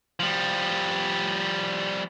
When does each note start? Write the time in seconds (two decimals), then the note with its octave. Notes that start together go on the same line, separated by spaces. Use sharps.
0.20 F3 G3